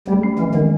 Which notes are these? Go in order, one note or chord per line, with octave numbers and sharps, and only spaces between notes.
G3 A3
C#4
E3 F3
D#3 G#3